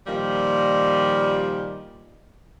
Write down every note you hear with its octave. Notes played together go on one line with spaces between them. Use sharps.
A#2 D#3 F3 G3